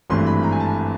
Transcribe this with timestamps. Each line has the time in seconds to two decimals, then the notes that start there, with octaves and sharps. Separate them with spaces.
0.10 G#1 G2 E3 A3 C4 C6
0.26 B5
0.43 A#5
0.52 G#5
0.60 A5